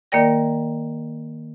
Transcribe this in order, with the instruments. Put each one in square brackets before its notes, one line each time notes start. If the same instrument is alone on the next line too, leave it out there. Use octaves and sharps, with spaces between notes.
[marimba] D#3 A#3 A#4 D5 G5 A#6